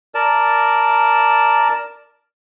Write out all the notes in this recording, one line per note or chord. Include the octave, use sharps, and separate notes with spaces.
A#4 D5 A5